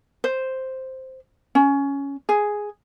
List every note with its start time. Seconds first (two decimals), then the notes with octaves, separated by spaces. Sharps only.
0.24 C5
1.55 C#4
2.29 G#4